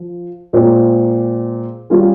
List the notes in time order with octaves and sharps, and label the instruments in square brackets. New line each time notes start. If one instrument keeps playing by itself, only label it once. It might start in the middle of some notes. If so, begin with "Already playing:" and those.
Already playing: [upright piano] F3
A#2 G#3 C4
G3 C#4 F4 G#4